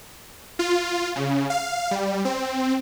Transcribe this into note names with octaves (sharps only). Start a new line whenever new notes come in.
F4
C#3
F5
G3
C4